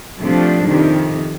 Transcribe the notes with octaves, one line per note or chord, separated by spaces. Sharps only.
C3 F3 A3 D4
F2 C3 D#3